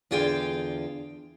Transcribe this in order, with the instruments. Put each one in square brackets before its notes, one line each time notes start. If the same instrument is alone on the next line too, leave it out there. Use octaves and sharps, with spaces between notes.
[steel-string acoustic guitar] E2 D3 F4 G#4 G5